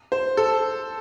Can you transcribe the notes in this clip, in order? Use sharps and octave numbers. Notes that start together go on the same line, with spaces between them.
C5
A4